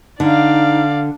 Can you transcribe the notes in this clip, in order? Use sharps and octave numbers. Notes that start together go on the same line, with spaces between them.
D3 D#4 D5 F5